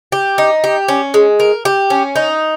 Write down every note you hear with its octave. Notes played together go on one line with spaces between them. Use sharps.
G4
D#4
G4
C#4
G#3
A#4
G4
C#4
D#4